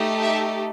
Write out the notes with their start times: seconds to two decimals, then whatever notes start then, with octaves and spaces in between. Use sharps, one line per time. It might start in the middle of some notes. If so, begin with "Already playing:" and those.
Already playing: A3 D#4 G4
0.22 E5